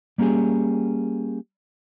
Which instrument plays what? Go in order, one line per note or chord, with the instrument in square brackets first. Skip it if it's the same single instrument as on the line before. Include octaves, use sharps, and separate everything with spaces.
[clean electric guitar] G3 A#3 C#4 G4 G#4